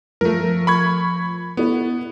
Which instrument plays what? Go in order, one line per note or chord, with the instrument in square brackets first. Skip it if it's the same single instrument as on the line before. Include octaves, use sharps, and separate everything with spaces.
[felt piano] F3 [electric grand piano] A3 A#4
[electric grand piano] B5 C#6 G#6
[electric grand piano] B3 [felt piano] E4 B4